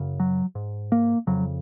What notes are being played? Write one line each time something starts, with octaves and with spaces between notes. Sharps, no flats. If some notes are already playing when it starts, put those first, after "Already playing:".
Already playing: F#2 C#3
F#3
G#2
A#3
F2 C#3 F#3